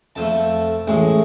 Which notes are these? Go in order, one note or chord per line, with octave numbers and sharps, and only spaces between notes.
F2 F3 A3 A5
A1 A2 G#3